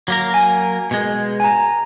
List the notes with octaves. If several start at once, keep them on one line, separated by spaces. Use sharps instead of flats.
F#3 A#3 A#4
G#5
B2 G#3
G#5 A#5